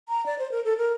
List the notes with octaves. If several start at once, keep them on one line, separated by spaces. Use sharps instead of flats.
A#5
D5
C5
A#4
A4
A#4